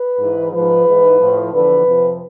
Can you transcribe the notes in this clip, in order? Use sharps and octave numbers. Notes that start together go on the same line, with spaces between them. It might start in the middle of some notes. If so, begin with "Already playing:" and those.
Already playing: B4
G#2 E3
G#2 F3 B4
G#2 E3
A2 F3
E2 D3 F3 B4
F2 C3 F3